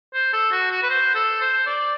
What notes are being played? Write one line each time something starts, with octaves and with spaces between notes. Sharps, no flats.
C5
A4
F#4
F#4
B4
C5
A4
C5
D5